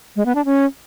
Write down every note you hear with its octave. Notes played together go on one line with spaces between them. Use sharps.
G#3
B3
D4
C#4